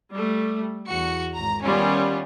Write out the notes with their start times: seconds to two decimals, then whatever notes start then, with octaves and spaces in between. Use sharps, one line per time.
0.11 G3 A3
0.89 E2 F#4 C#7
1.33 G#1 A#5
1.63 D#3 G3 B3 C#4 F4